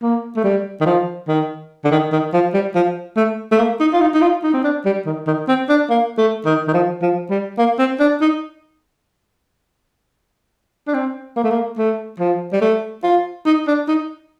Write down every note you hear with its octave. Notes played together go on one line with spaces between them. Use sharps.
A#3
A3
G3
D#3
F3
D#3
D3
D#3
D#3
F3
G3
F3
A3
A3
A#3
D#4
F4
D#4
D#4
F4
D#4
C4
D4
G3
D#3
D#3
C4
D4
A#3
A3
D#3
D#3
F3
F3
G3
A#3
C4
D4
D#4
D4
C4
A#3
A3
A#3
A3
F3
G3
A3
F4
D#4
D4
D#4